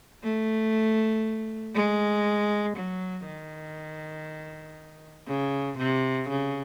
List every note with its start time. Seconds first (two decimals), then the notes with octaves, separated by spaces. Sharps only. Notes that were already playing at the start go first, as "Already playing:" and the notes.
0.23 A3
1.75 G#3
2.76 F#3
3.26 D#3
5.27 C#3
5.78 C3
6.29 C#3